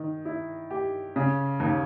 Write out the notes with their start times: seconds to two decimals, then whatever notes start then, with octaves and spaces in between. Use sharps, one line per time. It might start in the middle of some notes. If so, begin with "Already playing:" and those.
Already playing: D#3
0.25 E4
0.71 G4
1.16 C#3
1.60 D#2